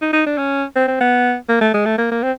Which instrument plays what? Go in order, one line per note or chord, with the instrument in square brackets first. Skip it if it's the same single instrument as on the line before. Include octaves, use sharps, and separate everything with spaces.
[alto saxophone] D#4
D#4
D4
C#4
C4
C4
B3
A#3
A3
G#3
A3
A#3
A#3
C4